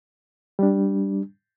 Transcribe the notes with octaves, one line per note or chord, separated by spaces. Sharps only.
G3 D4